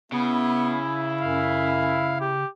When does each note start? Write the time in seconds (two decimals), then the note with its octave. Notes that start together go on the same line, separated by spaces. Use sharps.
0.12 C#3 B3 E4
1.21 F#2 F5
2.21 G4